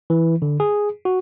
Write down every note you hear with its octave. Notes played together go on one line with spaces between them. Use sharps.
E3
D3
G#4
F#4